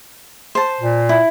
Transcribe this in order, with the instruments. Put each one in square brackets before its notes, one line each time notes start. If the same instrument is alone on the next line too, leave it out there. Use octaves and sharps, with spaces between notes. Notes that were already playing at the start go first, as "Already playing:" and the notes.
[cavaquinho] C5 A5
[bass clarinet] A#2
[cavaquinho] E4